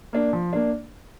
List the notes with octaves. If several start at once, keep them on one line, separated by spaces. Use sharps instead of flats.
A#3 D4
F3
A#3 D4